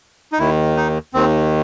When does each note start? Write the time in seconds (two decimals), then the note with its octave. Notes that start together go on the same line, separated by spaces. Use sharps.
0.32 D#4
0.39 D#2 D#3 E4
0.77 D#4
1.14 D#2 D#3 C4